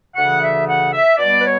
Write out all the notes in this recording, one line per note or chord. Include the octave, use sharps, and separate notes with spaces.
D2 C#3 E3 F#5
E5
F#5
E5
B2 G3 B3 D5
B4
C#5